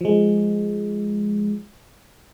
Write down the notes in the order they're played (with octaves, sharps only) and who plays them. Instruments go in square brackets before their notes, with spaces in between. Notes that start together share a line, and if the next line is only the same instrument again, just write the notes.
[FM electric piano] F3 G#3